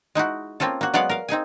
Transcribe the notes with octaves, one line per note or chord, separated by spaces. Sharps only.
G#3 D#4 E4 F#4
A#3 C4 C#4 F4 A4
A#3 F#4
F#3 G#3 B3 D5 F5 F#5
A#4 F5
C4 D#4 G#4 G#5